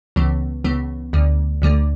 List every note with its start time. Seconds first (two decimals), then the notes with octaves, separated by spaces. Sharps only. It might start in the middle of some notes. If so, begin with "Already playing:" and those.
0.16 C#2 C#3 E3 B3
0.64 C#2 C#3 E3 B3
1.13 D2 D3 A3
1.62 D2 D3 A3